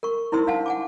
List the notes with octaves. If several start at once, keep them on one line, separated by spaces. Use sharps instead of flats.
A#4 C#6
D#4 E4 A#4 C5 C6 E6
D4 F5 F#5 A5
F#5 G#5 D6